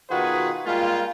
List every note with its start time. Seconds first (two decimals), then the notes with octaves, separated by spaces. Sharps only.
0.10 B2 D#3 F4 F#4 G#4 B4
0.66 G3 G#3 A#3 F4